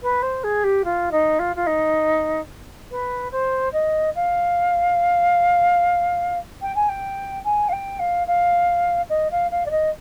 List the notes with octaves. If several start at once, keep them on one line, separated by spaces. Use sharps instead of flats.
B4
C5
G#4
G4
F4
D#4
F4
F4
D#4
B4
C5
D#5
F5
G5
G#5
G5
G#5
F5
G5
F5
F5
D#5
F5
F5
D5
D#5